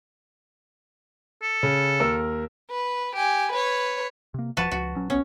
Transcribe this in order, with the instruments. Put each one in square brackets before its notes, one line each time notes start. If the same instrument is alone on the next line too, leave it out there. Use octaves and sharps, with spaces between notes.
[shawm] A4
[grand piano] C#3
D#2 A#4 E6
[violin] B4
G4 G#5
B4 C#5
[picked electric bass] C3 A#3
[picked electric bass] E1 F3 [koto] F#4 B4 A5
[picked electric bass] C#2 F3 [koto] F#4
[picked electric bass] A#1 F#3 C#4
[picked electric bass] B1 B3 [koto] C#4